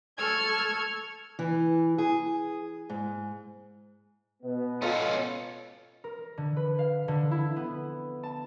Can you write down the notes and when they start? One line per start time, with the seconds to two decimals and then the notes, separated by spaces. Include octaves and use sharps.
0.18 A4 C#6 E6 F6 G#6
1.39 E3
1.98 G#4
2.90 G#2
4.42 B2 B3
4.82 C#4 D#4 F4 A4
6.04 A#4
6.37 D3
6.56 B4
6.79 F5
7.08 D3
7.31 E4
7.56 B3
8.23 A5